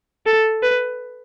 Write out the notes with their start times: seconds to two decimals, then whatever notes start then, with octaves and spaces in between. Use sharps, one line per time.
0.26 A4
0.63 B4